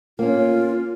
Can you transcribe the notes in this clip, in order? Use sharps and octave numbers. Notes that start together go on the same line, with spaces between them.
A#3 C#4 F4